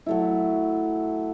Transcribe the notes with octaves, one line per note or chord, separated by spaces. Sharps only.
F#3 A3 E4